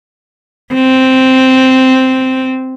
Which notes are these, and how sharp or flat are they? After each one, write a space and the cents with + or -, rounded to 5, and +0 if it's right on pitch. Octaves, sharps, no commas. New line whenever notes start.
C4 -5